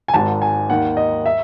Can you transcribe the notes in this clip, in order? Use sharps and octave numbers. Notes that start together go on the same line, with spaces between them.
G#5
G#1 G#2 D#3 A5
G#5
D#2 D#3 F#5
D#5
E5